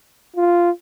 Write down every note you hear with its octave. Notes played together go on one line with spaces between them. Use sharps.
F4